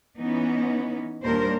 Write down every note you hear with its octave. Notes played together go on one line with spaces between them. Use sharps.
E3 B3 C#4 D#4
D#2 A#2 G3 D4 A#4 C5